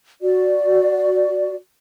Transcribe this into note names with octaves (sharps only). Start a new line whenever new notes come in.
F#4 D5